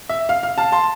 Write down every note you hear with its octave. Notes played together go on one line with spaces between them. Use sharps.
E5
F5
F5
F5 A5
A5 C6